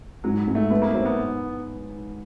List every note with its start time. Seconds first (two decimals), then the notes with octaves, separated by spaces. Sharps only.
0.24 G#2 F#3
0.48 G#2
0.55 A3
0.70 A3 B3
0.82 A#3
0.94 F#3 C4
1.05 B3